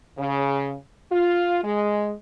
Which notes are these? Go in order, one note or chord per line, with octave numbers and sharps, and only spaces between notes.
C#3
F4
G#3